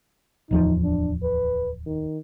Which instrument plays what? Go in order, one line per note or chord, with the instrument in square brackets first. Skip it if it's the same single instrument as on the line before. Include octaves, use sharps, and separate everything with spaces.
[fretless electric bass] D1 E2 F3 [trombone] D#4
[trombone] D4
B4
D#3